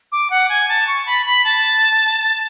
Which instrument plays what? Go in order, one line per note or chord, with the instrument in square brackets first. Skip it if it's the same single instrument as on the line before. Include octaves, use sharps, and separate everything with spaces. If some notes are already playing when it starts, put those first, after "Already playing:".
[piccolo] D6
F#5
G#5
A5
C#6
B5
B5
A5